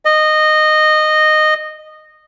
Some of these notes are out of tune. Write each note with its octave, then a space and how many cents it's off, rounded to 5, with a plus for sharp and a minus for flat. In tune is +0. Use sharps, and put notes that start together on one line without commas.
D#5 -15